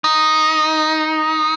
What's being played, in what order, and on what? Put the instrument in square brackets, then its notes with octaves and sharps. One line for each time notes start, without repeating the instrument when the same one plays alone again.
[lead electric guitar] D#4